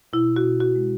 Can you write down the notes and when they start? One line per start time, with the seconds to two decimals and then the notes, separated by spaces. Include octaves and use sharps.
0.13 B2 E4
0.36 F#4
0.44 B2
0.60 F#4
0.75 G#3